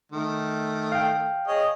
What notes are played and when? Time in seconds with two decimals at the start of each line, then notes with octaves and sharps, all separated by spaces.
0.12 D#3 A3
0.92 F5 G5
1.47 G#4 C#5 D#5